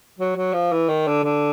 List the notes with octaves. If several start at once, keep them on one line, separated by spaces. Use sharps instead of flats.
F#3
F#3
F3
E3
D#3
D3
D3